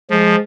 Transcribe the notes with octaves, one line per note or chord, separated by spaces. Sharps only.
F3 G#3